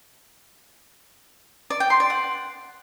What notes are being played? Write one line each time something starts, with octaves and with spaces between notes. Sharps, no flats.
D5
G5
C6
D5
F#5